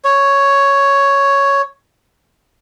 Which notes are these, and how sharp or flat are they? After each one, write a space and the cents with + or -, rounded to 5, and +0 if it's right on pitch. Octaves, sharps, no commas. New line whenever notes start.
C#5 +5